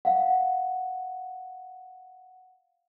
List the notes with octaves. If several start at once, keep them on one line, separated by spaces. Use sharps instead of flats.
F5 F#5